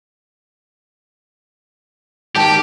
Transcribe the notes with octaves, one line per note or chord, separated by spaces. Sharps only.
D#3 G4 G5 A5